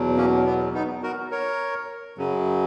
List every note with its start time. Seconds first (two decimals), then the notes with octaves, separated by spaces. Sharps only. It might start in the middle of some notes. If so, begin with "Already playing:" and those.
Already playing: E2 B2 F#3
0.17 A#3 C#4
0.46 B3
0.74 B3 D#4
1.03 F#4 A#4
1.31 A#4 C#5
2.18 F#2 C#3 F#3